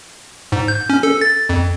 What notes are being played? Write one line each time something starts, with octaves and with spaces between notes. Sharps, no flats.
G#2
G6
C#4
A4
A6
F2